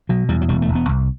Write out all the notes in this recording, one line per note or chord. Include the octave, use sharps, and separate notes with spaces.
B2 F#3
E2 G3
F#3
E1 G3
A3
E1
B3
C2